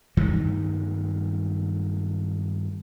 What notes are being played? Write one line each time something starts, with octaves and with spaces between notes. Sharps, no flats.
G2 D#3 F#3 A3